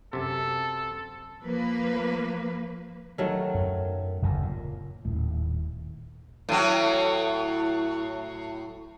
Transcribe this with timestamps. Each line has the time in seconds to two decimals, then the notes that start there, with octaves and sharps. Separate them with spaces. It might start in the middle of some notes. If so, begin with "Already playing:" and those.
0.13 F#2 C3 A4
1.43 F3 A#3 B4
3.18 D#3 F#3 A3
3.55 F#2
4.22 F#1 D#2 A#2
4.42 A#2
5.05 D#1 A2
6.49 A2 F#3